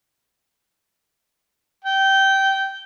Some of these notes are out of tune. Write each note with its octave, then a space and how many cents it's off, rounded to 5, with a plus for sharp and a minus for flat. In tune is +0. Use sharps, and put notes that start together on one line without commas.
G5 -15